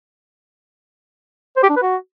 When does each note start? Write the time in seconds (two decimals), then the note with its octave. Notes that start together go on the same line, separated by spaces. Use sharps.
1.57 C5
1.63 G4
1.70 D4
1.76 B4
1.82 F#4